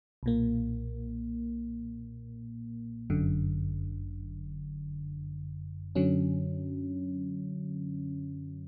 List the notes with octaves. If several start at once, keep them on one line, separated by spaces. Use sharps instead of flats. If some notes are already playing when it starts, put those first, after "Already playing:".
B1 A#2 A#3
G1 F#2 D3
F#2 D3 F#3 C#4